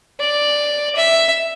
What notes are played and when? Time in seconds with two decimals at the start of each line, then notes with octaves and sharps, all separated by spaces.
0.20 D5
0.96 E5